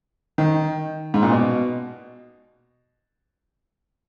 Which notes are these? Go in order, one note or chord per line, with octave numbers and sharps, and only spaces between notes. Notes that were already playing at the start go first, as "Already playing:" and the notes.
D#3
G#2
A#2
B2